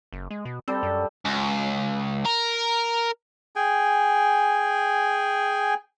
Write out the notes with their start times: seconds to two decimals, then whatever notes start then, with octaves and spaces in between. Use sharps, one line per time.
0.13 F#1
0.31 G#3
0.45 B2
0.68 G3 C4 A4
0.83 F#2
1.25 C#2
2.25 A#4
3.56 G#4 G5 G#5